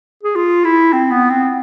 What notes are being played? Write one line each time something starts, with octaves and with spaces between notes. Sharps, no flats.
G#4
F4
E4
C4
B3
C4